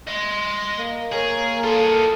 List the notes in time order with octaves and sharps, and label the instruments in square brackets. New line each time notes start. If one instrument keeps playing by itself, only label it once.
[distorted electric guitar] D#5 C6
[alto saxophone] A#3
[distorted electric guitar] G#4 [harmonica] A#4 C#5
[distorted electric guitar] F4 D#5 [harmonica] A4